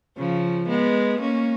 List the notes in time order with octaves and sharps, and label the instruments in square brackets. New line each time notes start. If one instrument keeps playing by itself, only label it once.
[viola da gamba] C#3 F3
G#3 B3
A#3 C#4